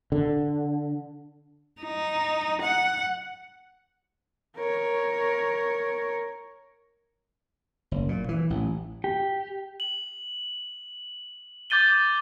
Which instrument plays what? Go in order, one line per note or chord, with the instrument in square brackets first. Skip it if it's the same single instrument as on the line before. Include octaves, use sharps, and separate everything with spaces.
[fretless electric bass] D3
[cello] D#4
F#5
[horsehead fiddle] A#4 C#5
[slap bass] F#1
A#2
E3
A1
[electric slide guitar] G4
[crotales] F#7
D6 G6 A6 D#7 G7